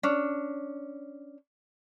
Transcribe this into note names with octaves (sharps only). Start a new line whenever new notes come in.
C#4 D4